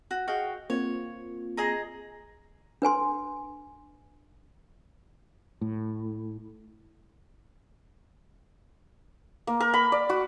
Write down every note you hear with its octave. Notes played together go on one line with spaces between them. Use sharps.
F#4
F#4 G#4 D#5 F5 G5 C#6
A#3 C4 F4 C#5
G#4 D#5 A#5
D4 B4 G#5 C6
A2
A#3
A#4
B5
D5
F#4